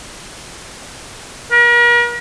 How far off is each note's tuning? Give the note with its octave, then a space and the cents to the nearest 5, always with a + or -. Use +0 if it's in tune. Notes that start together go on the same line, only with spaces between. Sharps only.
A#4 +40